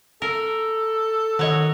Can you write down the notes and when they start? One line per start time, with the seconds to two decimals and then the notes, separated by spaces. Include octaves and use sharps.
0.22 A4 A#4
1.39 D#3 F#3 C#5 D#5